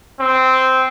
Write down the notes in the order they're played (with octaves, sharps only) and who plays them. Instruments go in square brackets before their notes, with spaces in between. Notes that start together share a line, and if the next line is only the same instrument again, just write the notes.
[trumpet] C4